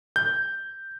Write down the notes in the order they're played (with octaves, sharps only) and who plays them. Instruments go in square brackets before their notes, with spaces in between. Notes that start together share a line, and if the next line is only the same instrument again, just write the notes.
[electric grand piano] G6